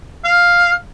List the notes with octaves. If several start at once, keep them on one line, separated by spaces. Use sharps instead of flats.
F5